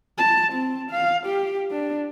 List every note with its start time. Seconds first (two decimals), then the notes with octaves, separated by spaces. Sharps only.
0.18 A5
0.52 C4
0.91 F5
1.26 G4
1.71 D4